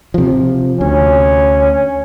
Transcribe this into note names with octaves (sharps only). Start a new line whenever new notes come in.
C3 F3
D2 C#4